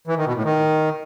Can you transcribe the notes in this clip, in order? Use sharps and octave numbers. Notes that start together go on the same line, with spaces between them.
E3
D#3
B2
A2
D#3